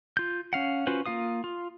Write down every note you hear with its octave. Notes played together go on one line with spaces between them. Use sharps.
F4 G6
C#4 F5 F#5
C#4 F4 F#4 B4 C5
A#3 F4 F5 D#6
F4